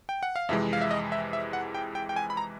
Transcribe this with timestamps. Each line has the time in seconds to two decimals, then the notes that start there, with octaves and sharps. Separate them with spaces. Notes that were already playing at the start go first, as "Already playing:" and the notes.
0.09 G5
0.23 F#5
0.36 F5
0.49 F2 C3 E3 G#3 E5
0.73 F5
0.81 E5
0.91 D#5
1.12 E5
1.33 E5
1.53 F#5
1.75 G5
1.95 G5
2.09 G5
2.16 G#5
2.30 B5
2.37 A#5